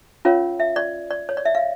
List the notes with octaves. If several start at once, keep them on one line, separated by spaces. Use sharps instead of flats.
C#4 F4 A#4 C#5 F5
E5
D5
D5
C#5
D5
E5
F5